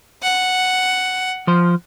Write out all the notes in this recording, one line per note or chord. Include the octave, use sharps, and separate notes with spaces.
F#5
F3 C5